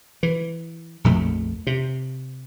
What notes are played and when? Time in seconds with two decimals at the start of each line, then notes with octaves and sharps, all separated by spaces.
0.23 E3
1.04 A#1 F2 A3
1.67 C3